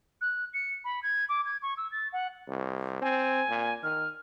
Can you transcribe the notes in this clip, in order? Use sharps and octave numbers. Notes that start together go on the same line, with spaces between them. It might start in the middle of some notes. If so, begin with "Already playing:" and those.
F#6
C#7
B5
G#6
D6
G#6
C#6
E6
A6
F#5
C2
C4 G#5
A#2
D#3 F6